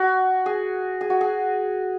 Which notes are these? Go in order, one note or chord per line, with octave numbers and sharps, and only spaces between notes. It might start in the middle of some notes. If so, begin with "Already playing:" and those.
Already playing: F#4
G#4
G#4
F#4
G#4